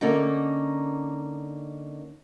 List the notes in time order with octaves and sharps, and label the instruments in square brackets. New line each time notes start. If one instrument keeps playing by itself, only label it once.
[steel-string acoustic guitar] D3 A#3 C#4 D#4